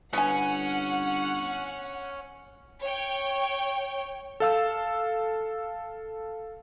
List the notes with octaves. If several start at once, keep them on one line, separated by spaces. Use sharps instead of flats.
G1 B3 C#4 F#5 G#5
C#5 G5
A4 F5 E6